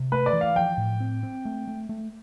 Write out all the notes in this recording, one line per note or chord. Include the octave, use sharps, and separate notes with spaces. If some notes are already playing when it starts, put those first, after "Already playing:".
Already playing: C3
A3 B4
D5
E3
F5
F3 G5
A2
C4
C4
A3
A3
A3